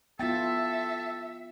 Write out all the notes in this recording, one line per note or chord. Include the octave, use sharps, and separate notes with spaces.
B3 E4 F4 A4 E5 G5 A6